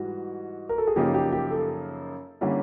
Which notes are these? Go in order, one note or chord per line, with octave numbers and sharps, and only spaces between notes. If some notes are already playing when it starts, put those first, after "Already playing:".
Already playing: G#2 E3 G3 F#4
A#4
A4
G#4
F#2 C#3 F3 A#3 D#4 G4
G4
G4
A4
D3 G3 A#3 C#4 E4